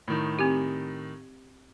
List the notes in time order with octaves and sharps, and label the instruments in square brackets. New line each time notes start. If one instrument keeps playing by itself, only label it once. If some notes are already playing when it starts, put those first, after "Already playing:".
[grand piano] A2 D#3
[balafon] C4 G4